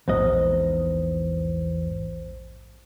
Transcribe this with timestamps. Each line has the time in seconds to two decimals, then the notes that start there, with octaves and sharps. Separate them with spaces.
0.08 A#1 E2 G#2 C5 D#5